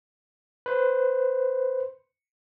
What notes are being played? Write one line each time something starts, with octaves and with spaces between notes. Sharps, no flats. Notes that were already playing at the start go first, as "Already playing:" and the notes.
B4 C5